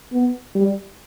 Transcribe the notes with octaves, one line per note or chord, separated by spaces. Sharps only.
B3
G3